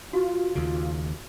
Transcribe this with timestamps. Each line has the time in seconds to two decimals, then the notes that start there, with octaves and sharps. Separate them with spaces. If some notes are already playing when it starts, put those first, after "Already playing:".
0.13 F4 F#4
0.55 D#2 C#3